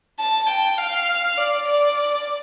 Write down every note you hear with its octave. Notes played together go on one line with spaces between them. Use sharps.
A5
G5
F5
D5
D5